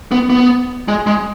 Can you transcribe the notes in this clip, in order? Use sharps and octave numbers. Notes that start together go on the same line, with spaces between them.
B3
B3
G#3
G#3